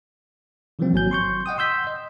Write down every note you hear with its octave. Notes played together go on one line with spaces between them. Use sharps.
C3 E3 F3 G3 A#3 C4
G#1 F#3 G#5 G6
C6 C#6 G6
D#5 F#5 G5 D#6
C6 E6 G6 B6
D#5